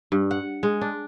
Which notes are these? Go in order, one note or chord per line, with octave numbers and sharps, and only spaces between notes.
G2
F#5
G#3
D4